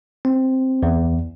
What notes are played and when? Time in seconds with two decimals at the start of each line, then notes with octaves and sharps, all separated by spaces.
0.25 C4
0.83 E2